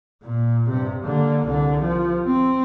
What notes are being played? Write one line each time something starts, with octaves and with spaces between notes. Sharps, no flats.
A#2
G2 C3
D3 A#3
C2 D3
F3
C4